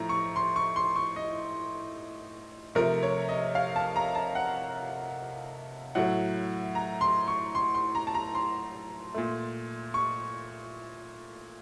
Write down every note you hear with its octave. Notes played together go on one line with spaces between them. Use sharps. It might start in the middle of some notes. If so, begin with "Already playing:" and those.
Already playing: A2 F3 A3 A#5
C#6
C6
C#6
C6
C#6
D#5
C3 F3 A3 A#4
C#5
D#5
F5
A5
A#5
A5
F#5
A2 F#3 A3 F#5
A#5
C6
C#6
C6
C6
A#5
A5
A#5
C6
A#2 A3
C#6